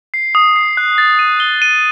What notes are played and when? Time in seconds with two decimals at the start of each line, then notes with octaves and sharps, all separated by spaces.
0.14 C7
0.35 D#6
0.56 C7
0.77 F#6
0.98 A6
1.19 D#7
1.40 G7
1.62 D#7